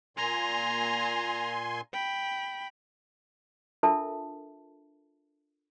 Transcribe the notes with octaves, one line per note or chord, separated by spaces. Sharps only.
A#2 G#5 A#5 C6
G5 B5
D4 F4 A4 A#4 E5 A5